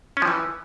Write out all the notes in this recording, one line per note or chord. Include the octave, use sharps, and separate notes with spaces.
C#4
F3
E3